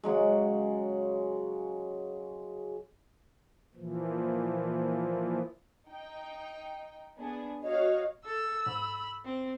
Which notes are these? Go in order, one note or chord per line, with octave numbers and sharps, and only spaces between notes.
C#3 F#3 G#3
A#2 E3 F3
D#4 G5
B3 D4 G#4
F#4 C#5 D#5 F5
A4 E6
G#2 B5
C4